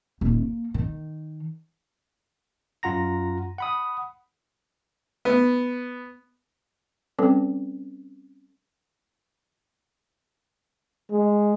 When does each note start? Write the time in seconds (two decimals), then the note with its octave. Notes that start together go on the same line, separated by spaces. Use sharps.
0.21 D#1
0.38 A#3
0.74 D#3
2.83 F#2 F4 F#5 A#5 A#6
3.58 F#5 B5 D#6
5.25 B3
7.19 G3 C4 C#4 A4 B4
11.11 G#3